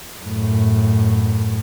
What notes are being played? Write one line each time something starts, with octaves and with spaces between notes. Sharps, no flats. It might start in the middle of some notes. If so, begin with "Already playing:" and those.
F#2 A2